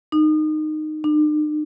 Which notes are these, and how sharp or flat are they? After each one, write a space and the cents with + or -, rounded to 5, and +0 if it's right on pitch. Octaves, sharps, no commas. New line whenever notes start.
D#4 -15
D#4 -45